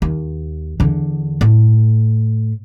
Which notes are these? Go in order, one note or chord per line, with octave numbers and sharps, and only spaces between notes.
D#2
E2 D3
A2